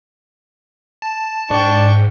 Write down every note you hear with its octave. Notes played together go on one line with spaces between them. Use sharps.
A5
G#2 D4 G5 C#6